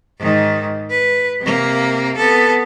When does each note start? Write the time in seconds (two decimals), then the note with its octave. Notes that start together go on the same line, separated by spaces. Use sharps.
0.19 G#2 D#3
0.90 B4
1.41 C3 A#3
2.17 B3 A4